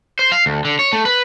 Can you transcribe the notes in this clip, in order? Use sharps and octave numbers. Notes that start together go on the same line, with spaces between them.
C5
F5
D2
D3
C#5
A3
B4